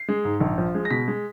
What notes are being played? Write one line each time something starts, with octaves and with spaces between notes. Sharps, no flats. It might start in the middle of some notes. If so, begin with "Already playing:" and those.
Already playing: C7
G#3
G#2
A#1
F3
G#3
A#6
B2 B6
G#3